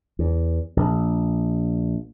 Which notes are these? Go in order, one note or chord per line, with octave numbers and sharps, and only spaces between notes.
E2
A#1